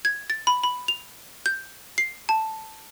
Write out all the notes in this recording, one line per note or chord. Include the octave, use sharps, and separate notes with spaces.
G#6
A6
B5
B5
F7
G6
C7
A5